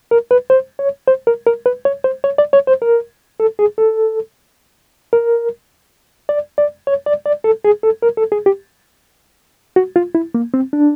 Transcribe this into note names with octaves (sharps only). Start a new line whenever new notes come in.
A#4
B4
C5
C#5
C5
A#4
A#4
B4
C#5
C5
C#5
D5
C#5
C5
A#4
A4
G#4
A4
A#4
D5
D5
C#5
D5
D5
A4
G#4
A4
A#4
A4
G#4
G4
F#4
F4
E4
A#3
C4
D4